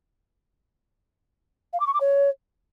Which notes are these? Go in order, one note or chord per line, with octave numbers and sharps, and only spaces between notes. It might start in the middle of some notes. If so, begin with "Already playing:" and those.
F5
D6
C#6
D6
C#5